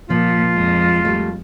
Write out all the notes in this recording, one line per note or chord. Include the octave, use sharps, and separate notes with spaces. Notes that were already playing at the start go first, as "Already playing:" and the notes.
A#2 F3 F4
F2 G#3
G3 A3